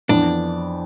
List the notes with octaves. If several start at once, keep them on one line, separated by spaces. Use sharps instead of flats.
F2 E3 B3 D4